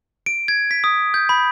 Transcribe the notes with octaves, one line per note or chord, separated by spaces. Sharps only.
D7
G#6
B6
D#6
G6
B5